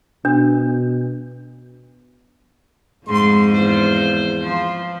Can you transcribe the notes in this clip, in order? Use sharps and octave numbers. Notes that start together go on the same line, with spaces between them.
B2 D4
F2 G#2 G#3 C6
E2 F4 C5
F3 C6